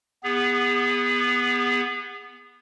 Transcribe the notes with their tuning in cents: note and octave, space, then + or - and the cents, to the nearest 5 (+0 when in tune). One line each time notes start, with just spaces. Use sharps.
B3 +0 G#4 -35